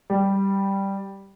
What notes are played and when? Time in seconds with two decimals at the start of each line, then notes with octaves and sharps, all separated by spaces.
0.10 G3